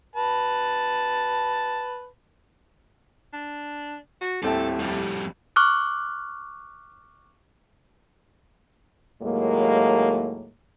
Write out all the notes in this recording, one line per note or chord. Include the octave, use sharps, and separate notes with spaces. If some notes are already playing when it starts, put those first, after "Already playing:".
B4 A5
D4
F#4
D#1 A2 C4 E4 A4
F2 G3
C#6 D6 F6 F#6
D#2 A2 F#3 G#3 A#3